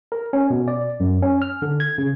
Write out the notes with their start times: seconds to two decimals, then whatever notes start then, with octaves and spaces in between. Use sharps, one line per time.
0.12 A#4
0.33 C#4
0.50 B2
0.68 D5
1.00 F#2
1.22 C#4
1.42 F6
1.62 D3
1.80 G#6
1.98 C#3